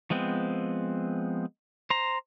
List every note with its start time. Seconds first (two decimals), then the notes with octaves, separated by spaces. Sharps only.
0.10 F3 G#3 B3 C4
1.90 C5 A#5